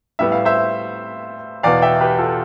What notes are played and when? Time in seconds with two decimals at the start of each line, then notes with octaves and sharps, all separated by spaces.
0.19 A2 G3 B3 E5
0.32 F5
0.45 C5 E5
1.63 E2 B2 B3 D5 F5
1.82 E5 G5
2.01 G4 B4
2.18 F4 A4